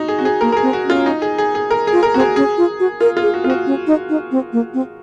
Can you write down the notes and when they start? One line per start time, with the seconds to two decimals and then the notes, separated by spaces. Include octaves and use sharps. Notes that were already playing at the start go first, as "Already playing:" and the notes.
Already playing: D#4 F#4
0.08 G#4
0.19 C4 F#4
0.25 G#4
0.41 A#3 A#4
0.52 A#4
0.57 G#4
0.62 C4
0.73 F#4
0.85 C#4 F4
1.06 D#4
1.22 G#4
1.38 G#4
1.55 G#4
1.71 A#4
1.87 G#4
1.92 F4
2.03 A#4
2.14 C4 F#4
2.20 G#4
2.36 C#4 G#4
2.57 F4
2.80 F#4
3.01 F4 A#4
3.17 F4
3.22 G#4
3.34 F#4
3.44 C4 F4
3.50 F#4
3.66 C#4
3.87 D#4
4.09 D#4
4.31 C4
4.53 A#3
4.74 C4